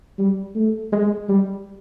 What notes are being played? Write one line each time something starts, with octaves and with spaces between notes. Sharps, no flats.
G3
A3
G#3
G3